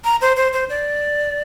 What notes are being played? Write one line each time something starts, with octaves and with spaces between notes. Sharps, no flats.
A#5
C5
C5
C5
D5